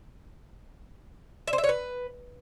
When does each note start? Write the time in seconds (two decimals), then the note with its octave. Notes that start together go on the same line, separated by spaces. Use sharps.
1.48 E5
1.53 C5
1.58 E5
1.64 C#5
1.69 B4